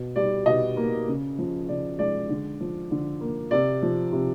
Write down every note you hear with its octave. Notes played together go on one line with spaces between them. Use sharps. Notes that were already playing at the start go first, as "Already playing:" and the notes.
Already playing: B2
G3 D5
B2 D#5
A#3
C#3
F3
C#3 D5
G#3 D5
D3
F3
D3
A#3
C3 D5
F3
C3